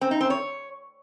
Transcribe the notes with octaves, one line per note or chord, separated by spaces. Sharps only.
C4
D#4
C4
C#5